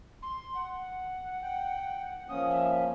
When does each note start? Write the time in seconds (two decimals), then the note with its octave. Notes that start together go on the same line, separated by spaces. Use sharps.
0.22 C6
0.55 F#5
1.43 G5
2.29 F3 A#3 C#4 D#6
2.50 E5